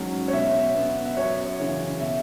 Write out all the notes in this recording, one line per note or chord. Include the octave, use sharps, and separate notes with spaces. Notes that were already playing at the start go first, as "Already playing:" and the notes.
Already playing: G#2 F#3 C#4
C#5
B2 E5
B3
E5
F#2 C#5
C#3 E3
B2 E5